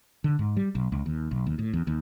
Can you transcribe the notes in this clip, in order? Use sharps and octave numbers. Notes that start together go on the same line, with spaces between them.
D3
G#2
G3
B1
C#2
D#2
B1
D#2
A2
E2
D#2